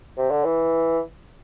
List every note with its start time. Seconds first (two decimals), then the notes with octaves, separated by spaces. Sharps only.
0.18 C3
0.31 D3
0.44 E3